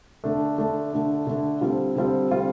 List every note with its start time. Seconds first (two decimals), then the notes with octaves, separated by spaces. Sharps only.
0.24 D3 A3 D4
0.58 D3 A3 D4
0.93 D3 A3 D4
1.27 D3 A3 D4
1.61 D3 G3 C4 F4
1.96 D3 G3 C4 F4
2.31 D3 G3 C4 F4